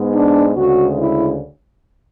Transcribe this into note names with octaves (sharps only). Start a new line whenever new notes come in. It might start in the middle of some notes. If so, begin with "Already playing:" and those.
Already playing: G#2 G#3 B3
D4
D2 C#3 G#3 F#4
E4